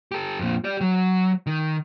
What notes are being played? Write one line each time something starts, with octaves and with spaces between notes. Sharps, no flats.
G4 A4
F2 A#2
G4 D5
F#3
D#3